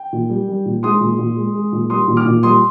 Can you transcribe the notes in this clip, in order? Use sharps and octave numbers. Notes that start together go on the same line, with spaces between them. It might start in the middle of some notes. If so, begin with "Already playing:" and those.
Already playing: G5
A#2
G3
G3
A#2
G#3 C6 D#6
A#2
A#2
G#3
G#3
A#2
G3 C6 D#6
A#2
D6 F6
A#2
G3 C6 D#6